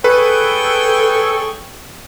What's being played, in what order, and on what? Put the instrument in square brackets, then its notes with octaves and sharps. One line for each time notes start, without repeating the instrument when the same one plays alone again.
[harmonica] G#4 C#5 G5 [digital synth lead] A4 [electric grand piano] B4